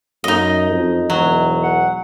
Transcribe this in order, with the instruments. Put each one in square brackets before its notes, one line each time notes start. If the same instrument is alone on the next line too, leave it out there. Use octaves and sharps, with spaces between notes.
[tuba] F#2 [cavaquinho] D#4 D#5
[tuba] F2
[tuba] E1 [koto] F#3
[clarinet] F#5